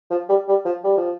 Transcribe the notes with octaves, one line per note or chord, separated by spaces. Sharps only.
F3
G3
G3
F3
G3
F3